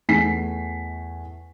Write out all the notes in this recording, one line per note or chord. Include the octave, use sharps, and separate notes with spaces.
E2 A3 G#5 B6 C7